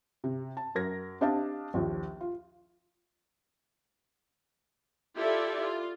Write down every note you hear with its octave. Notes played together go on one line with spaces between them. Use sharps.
C3
A5
F#2 A#4 G#6 A#6
C4 D4 G4 D#5 F5 A5
A#1 D#2 F3
F4
E4 F4 G4 A4 D5 E5
F4